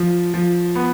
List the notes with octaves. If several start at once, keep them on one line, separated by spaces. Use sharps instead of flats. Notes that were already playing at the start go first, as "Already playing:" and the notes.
Already playing: F3
F3
B3